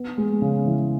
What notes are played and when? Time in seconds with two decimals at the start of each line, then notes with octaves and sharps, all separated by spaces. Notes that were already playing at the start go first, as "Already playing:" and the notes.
Already playing: B3
0.18 G#3
0.42 C#3
0.66 E3